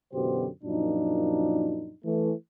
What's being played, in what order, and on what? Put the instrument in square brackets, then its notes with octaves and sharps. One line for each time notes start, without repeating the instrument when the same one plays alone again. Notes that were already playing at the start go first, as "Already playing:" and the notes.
[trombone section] F#2 B2 D3 E3 G4 C5
F#2 A#2 F3 D4 D#4
E3 A3